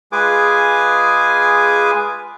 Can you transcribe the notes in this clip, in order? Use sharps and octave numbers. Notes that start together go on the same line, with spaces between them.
G#3 F4 G#4 B4 G#5 D6